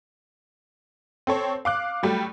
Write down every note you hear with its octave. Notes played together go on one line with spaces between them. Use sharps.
C4 A4 C#5
F5 D6 F#6
F#3 G3 A3